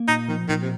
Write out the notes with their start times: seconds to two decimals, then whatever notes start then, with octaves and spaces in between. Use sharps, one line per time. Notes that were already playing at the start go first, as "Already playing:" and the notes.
Already playing: A#3
0.08 A#2 D#4
0.28 D#3 F3
0.48 A#2 D#3
0.62 C3